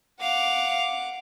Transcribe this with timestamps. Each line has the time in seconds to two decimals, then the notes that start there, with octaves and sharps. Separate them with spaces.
0.20 F5 F#5 D6